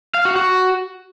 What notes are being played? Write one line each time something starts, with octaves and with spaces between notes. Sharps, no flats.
F5
F#4
F#4